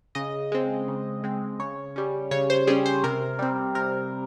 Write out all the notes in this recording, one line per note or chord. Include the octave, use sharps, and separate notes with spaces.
C#3 D#5
G#3 C4
C#3
G#3 C4
C#3 C#5
G3 C#4
C#3 C#5
C5
G3 C#4 G#4
C5
C3 A#4
G3 C4
C3 A#4